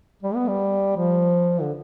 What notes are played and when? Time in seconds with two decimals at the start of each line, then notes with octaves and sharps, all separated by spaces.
0.23 G3
0.35 B3
0.47 G3
0.97 F3
1.61 D3